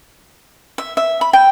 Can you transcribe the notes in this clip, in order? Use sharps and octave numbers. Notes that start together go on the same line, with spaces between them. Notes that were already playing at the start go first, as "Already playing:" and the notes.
E5
E5
B5
G5